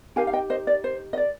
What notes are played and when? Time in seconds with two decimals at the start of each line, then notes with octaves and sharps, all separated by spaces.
0.16 D#4 G4 A#4 F5 G#5
0.27 F5
0.33 D#5 G5
0.50 C5 D#5
0.67 D5
0.84 C5
1.13 D#5
1.17 D5